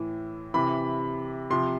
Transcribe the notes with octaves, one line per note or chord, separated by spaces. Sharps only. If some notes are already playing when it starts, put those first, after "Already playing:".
Already playing: A2 E3
C3 E3 B5
C3 F3 C6